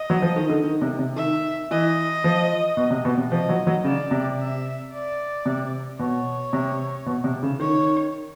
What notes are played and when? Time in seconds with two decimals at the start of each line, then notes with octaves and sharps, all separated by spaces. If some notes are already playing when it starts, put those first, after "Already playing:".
Already playing: D#5
0.10 F#3
0.22 F3
0.36 D#3
0.49 D3
0.63 D#3
0.81 C3
0.99 C3
1.16 D#3 E5
1.70 E3 D#5
2.24 F3
2.77 B2
2.91 C3
3.05 B2
3.18 C3
3.32 F3 D#5
3.49 F#3
3.67 F#3
3.84 C#3 D5
4.11 C3
4.38 E5
4.92 D5
5.46 C3
5.99 B2 C#5
6.53 C3
7.06 B2
7.24 C3
7.43 C#3
7.60 D#3 C#5